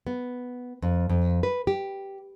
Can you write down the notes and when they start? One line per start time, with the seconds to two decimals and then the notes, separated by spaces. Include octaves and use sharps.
0.07 B3
0.82 F2
1.10 F2
1.43 B4
1.67 G4